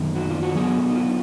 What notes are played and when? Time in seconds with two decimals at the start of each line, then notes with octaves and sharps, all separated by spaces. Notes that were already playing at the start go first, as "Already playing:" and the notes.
Already playing: F#2 D#3 A#3
0.15 F#4
0.29 F4
0.43 F#4
0.55 D3 F#3 B3 G#4
0.90 D#4
0.96 F4